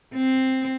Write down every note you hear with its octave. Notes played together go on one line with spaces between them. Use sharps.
C4